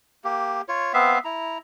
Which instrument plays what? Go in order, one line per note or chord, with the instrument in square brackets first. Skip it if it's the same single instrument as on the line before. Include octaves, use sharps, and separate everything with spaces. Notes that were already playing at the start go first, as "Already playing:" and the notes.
[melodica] A#3 G4
F4 C#5
B3 C4 E5 F5
E4 A#5